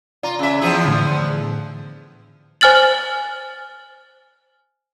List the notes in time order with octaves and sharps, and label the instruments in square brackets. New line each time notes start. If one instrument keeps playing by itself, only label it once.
[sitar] F4 [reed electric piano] D5 A#5
[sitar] C#3 E5
E2 F3 G#4
[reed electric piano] A2 D3
[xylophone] C5 G#5 F6 A6 F#7